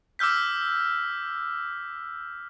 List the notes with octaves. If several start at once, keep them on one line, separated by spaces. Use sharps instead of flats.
D6 E6 F6 G6 B6